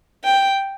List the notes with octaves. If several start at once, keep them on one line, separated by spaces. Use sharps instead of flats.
G5